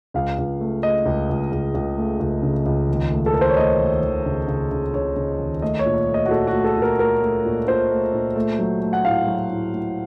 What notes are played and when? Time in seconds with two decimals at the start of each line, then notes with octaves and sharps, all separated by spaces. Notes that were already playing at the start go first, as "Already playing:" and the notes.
0.14 C#2 F5
0.38 C#2
0.60 A3
0.83 A3 D#5
1.06 C#2
1.29 C#2
1.52 C#2
1.74 C#2
1.97 A3
2.20 C#2
2.42 C#3
2.66 C#2
2.89 D#2
3.11 A3
3.26 A4
3.34 D#2 A#4
3.41 C5
3.50 C#5
3.56 A3 D#5
3.80 D#2
4.03 D#2
4.25 C#3
4.48 C#3
4.71 C#3
4.93 C#3 C#5
5.16 C#3
5.40 D#2
5.62 A3 D#5
5.79 C#5
5.86 A#2
6.08 A3
6.14 D#5
6.26 F#4
6.30 A#2 A4
6.47 F#4
6.54 A3
6.64 A4
6.77 A#2
6.82 A#4
6.99 A3 A#4
7.22 A3
7.45 A#2
7.67 A#2 C5
7.91 A3
8.13 A#2
8.36 A3
8.59 F#3
8.82 A3
8.93 F#5
9.05 A2 F5
9.27 F#3
9.50 A2
9.73 A2